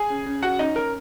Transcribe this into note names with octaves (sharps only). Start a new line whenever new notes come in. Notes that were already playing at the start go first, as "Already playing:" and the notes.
Already playing: G#4 G#5
C#3
C#3
C#4 F#4 F#5
C#4 D#4 D#5
A#4